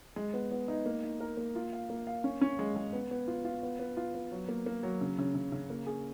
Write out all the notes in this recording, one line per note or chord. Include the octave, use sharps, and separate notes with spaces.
G#3
B3
B3
D#4
A#3
D#4
A#4
A#3
F4
F5
A#3
F5
C#4
C#4
G#3
G#3
B3
B3
F4
F4
B3
B3
F4
B3
F#3
A#3
A#3
F#3
C#3
C#3
C#3
C#3
A#3
G#4